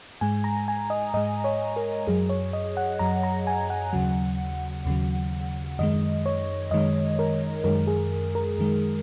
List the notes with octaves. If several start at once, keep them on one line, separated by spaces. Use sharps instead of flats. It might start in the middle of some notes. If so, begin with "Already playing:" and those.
G#2 G#3 G#5
A#5
G#5
D#5
G#2 G#3 D#5
C#5
A#4
F#2 F#3 G#4
C#5
D#5
F#5
F#2 F#3 A#5
A#5
G#5
F#5
D#2 C#3 F#3
D#2 C#3 F#3
F#2 D#3 G#3 D#5
C#5
F#2 D#3 G#3 D#5
A#4
F#2 D#3 G#3 A#4
G#4
A#4
F#2 D#3 G#3